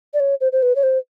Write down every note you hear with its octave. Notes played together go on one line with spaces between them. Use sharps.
D5
C#5
C5
C5
B4
C#5
C5